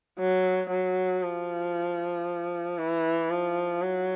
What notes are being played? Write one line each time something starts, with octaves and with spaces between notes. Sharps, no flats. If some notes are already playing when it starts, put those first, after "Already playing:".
F#3
F#3
F3
E3
F3
F#3